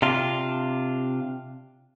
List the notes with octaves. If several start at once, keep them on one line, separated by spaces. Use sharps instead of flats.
C3 D4 F4